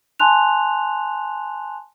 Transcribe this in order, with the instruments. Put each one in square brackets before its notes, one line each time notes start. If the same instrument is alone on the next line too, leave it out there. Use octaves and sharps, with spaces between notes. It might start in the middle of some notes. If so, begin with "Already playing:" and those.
[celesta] G#5 A5 C6 F#6 F7